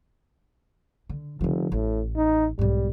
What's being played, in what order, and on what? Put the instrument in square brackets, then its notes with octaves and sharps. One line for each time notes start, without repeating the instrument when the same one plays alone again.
[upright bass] D3
[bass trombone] F1 [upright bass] D3 F3
[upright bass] A1 [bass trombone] A2
[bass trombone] D#4
[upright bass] B1 G#2 [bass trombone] G3